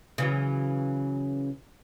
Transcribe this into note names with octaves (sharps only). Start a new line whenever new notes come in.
C#3 E3 F#3